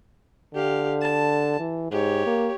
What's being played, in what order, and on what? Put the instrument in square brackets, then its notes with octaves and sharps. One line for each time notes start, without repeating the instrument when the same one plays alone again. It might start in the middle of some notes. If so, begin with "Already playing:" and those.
[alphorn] D3 [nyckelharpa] G4 F5
[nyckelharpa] A5
[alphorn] E3
[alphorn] G#2 [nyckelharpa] G4 C#5
[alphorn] A#3